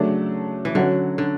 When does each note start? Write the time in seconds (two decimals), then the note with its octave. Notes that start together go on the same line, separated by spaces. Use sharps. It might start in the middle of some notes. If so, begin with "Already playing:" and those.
Already playing: C#3 F#3 A3 D4
0.65 E3
0.75 D3 F#3 C#4 F#4
1.18 D3